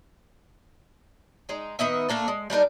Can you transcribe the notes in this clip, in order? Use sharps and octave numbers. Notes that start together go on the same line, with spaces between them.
G#3 D#4
D#3 B3 D#5 E5
A3 A#3 D4 A4
G#3
G3 D4 D#4 A#4